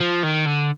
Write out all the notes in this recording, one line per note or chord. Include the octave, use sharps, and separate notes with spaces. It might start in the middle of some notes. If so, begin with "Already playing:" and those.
F3
D#3
D3